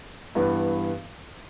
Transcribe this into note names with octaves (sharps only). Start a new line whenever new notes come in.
G2 E3 B3